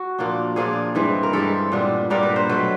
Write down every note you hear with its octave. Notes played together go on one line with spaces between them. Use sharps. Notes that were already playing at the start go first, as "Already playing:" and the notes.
Already playing: F#4
A#2 F3 A#3 D4
A#2 F3 A#3 D4 G#4
G2 E3 G#3 C4
A#4
G2 E3 G#3 C4 A4
A#2 G3 B3 D4
A#2 G3 B3 D4 A#4
B4
C5
B2 F#3 A3 B4